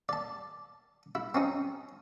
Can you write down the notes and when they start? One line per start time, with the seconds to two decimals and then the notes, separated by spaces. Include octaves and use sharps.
0.09 D5 A5
1.15 E4
1.35 C4 C#4 D#4